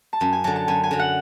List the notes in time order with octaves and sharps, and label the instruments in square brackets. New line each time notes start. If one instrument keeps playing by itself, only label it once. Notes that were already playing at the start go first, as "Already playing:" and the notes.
[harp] A5
[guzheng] F#2 [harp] G#5
[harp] G#5
[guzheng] D3 F#3 [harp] A5
[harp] A5
[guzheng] F#2 [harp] G#5
[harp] G#5
[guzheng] D3 F#3
[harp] F#5